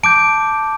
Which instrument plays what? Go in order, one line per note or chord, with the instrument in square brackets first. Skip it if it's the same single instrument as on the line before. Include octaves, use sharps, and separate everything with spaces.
[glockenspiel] A5 D6 G6 D7